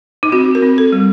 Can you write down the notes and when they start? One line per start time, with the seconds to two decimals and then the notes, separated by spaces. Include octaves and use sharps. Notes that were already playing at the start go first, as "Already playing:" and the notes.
0.23 D#4
0.32 C4 F#4
0.55 A#4
0.62 C4
0.78 A4
0.92 G3